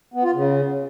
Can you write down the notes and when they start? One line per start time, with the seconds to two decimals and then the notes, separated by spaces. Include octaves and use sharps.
0.14 B3
0.24 F4
0.34 C#3